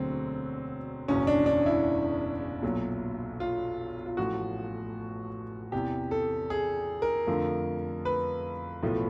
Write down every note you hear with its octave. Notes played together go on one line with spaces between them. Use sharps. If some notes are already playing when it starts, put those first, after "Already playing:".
Already playing: E1 D2 D3 F#3 C4
F#1 E2 B2 C#4
D4
D4
E4
B1 A#2 F#3
F4
F4
A1 A2 F3 A3 F#4
E2 C3 E3 G4
A4
G#4
A#4
F2 D3 F3 A3
B4
B1 A2 F3 A3